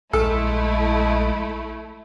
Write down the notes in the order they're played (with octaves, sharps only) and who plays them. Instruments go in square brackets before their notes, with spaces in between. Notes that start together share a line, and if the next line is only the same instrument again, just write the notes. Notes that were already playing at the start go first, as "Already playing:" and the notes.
[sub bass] A#1 [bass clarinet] G#3 [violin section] A3 E4 [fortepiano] A4